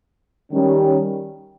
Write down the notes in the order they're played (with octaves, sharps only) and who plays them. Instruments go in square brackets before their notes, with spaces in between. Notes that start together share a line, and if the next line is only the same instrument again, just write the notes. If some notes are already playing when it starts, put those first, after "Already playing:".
[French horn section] D#3 G3 C#4